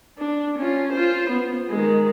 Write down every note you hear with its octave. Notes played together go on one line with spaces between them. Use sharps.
D4
C#4 F4
F4 C5
B3
D#3 G#3